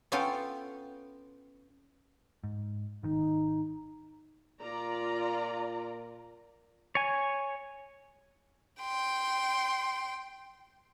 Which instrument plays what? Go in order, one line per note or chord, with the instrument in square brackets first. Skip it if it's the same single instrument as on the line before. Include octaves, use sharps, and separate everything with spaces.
[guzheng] B3 C#4 F4 A4 F5 G5
[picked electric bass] G#2
[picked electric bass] G#1 D#3 [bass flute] D#4
[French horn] A#2 [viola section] F4 D5 A#5
[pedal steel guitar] C#5 G#5
[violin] G5 C6